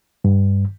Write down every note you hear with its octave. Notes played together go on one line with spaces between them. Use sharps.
G2